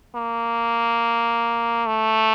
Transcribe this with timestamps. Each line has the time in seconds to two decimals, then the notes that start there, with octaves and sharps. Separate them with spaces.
0.15 A#3
1.87 A3